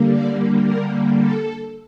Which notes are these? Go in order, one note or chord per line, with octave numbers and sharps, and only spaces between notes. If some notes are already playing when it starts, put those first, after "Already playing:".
Already playing: D3 G3 A#3
D5
A#4
A4